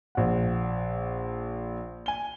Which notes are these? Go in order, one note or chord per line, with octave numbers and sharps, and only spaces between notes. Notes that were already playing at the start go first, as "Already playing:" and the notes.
A#1 F#5
G#5 G7